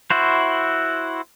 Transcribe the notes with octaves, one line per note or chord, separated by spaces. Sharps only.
E4 F#4 C5